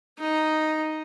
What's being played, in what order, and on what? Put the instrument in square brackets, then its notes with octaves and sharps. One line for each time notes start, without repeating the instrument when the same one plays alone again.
[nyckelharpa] D#4